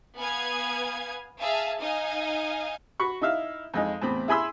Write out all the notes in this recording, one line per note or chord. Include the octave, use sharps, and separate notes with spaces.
B3 B4 F5 G#5 D#6 G#6
G#4 E5 F5 G#5 A5
D#4 D#5 F5 G#5
F#4 B5 C#6
D#4 E4 E5 F5
F2 G#3 D#4
E2 A2 C4 B5
E4 G#4 G#5 B5 C6 E6